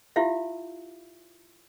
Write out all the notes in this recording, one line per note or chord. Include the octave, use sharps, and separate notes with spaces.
E4 F4 G4 E5 F5